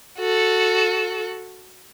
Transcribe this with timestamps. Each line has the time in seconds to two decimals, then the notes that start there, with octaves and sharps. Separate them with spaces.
0.19 F#4 A4